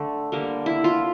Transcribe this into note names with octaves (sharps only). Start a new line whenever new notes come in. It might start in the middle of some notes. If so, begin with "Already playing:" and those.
Already playing: D3 A3
D3 G3 A#3
E4
F4